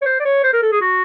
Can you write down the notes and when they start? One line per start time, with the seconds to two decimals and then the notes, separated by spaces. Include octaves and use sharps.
0.02 C#5
0.06 C5
0.20 D5
0.25 C#5
0.44 C5
0.53 A#4
0.62 A4
0.72 G#4
0.81 F#4